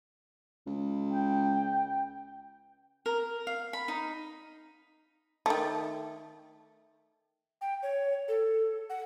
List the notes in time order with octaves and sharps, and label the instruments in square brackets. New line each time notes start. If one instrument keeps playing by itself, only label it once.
[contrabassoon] C#2
[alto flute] G5
[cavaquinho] A#4
F5
B5
D#4
[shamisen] D#3 A3
[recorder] G5
C#5
A4
F#5